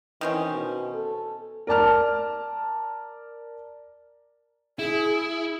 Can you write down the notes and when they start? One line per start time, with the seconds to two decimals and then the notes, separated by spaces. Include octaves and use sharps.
0.21 D#3 E3 C4 C#4
0.51 B2
0.94 A4
1.67 A#4 D5 A5 F6
4.79 E4 G#4